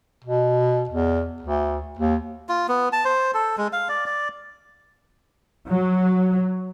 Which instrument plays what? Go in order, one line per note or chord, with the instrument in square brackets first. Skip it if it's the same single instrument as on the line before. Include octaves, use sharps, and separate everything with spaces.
[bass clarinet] B2
E2
D2
D#2
[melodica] F4
B3
A5
C5
A4
G#3
F5
D5
D5
[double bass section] F#3